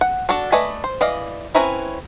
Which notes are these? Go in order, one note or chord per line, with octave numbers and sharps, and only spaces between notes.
F#5
D4 F#4 A4 D5
A3 B4 D5 D#5 G#5
C5
E3 D5 D#5 F5
C4 C#4 E4 B4 A#5